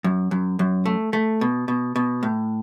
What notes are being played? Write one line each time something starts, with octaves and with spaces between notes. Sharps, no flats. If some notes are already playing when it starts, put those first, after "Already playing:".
F#2
F#2
F#2
A3
A3
B2
B2
B2
A2